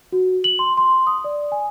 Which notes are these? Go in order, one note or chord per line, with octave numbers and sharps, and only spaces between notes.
F#4
F#7
C6
C6
D#6
D5
G#5